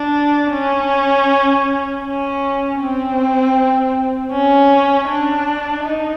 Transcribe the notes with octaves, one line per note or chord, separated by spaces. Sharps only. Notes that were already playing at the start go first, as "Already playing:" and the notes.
Already playing: D4
C#4
C#4
C4
C#4
D4
D#4